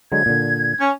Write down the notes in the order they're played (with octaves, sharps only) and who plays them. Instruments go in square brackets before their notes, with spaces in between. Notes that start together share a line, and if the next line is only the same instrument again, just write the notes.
[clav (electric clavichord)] D3 F#3 G#3 [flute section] G#6
[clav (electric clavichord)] A#2 D3
[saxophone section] C#4